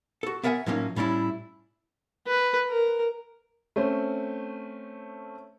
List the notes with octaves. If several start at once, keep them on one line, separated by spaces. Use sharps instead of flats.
F#4 A4
B3 A#4 E5 F#5 G#5
A2 F3 F#3 A#3 C#4 D#4
A2 G3 C#4 D4 E4
B4
A#4
A3 C4 C#4 C5